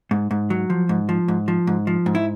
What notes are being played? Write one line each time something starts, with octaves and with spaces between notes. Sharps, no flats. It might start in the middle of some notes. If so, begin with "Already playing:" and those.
G#2
G#2
F#3
F3
G#2
F3
G#2
F3
G#2
F3
G#2
E4